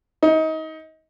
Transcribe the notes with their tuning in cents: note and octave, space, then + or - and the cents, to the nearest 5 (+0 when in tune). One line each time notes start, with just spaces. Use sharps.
D#4 +30